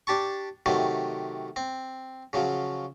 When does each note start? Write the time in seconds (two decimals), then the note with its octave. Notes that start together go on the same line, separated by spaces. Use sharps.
0.07 D4 G4 A5 C#6
0.66 C3 D#3 F#3 A3
1.56 C4
2.33 C#3 F3 F#3